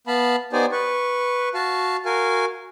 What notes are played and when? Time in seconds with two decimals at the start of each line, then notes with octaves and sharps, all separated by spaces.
0.07 B3 F5 A5 B5
0.53 B3 D#4 G4 C5 D5 G#5
0.72 B4 C#6
1.54 F#4 F5 A5
2.05 F#4 A#4 F5 G#5